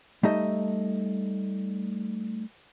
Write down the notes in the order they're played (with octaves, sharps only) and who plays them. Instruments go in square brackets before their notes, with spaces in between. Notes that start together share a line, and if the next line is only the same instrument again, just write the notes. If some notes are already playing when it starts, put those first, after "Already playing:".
[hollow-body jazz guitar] G3 A3 D#4 A4 D#5 E5